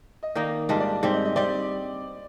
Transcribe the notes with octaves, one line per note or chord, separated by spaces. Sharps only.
D#5
D#3 A#3 D#4 D5
G#2 G3 D4 F4 D#5
D5
G#2 G3 C4 D5
D#5
D#5
G3 C4 D5